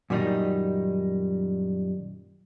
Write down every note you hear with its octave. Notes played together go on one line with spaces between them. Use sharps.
F#2 A#2 D#3 G3 D#4